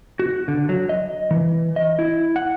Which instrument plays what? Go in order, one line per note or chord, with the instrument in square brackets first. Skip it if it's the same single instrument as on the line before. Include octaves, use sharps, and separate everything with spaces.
[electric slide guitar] F#4
D3
F#3
D#5
E3
D#5
E4
F#5